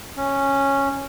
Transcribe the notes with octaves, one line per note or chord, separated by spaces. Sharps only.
C#4